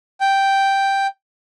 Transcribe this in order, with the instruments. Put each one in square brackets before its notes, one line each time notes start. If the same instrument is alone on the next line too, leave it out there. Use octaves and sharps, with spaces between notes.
[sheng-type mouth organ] G5